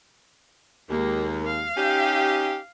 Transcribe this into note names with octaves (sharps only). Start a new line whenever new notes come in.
D#2 G#3 A#3
F5
C#4 D#4 G4